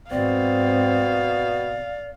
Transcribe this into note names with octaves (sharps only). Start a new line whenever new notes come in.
G#2 B2 C4 D5 F5